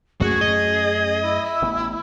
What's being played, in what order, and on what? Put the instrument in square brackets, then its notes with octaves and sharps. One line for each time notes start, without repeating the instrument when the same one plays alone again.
[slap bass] F#2 A3 C#4 [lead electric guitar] F#4 [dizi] G#4
[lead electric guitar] D#5
[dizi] E4
[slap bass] A1 E3 B3